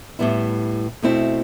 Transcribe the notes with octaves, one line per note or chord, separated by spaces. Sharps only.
A2 G3 B3 E4
B2 A3 C4 E4